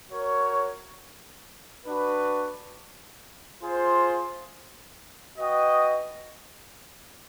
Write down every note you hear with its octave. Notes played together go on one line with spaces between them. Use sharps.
F#4 A#4 C#5
D4 F#4 B4
F4 G#4 C5
F#4 B4 D#5 G5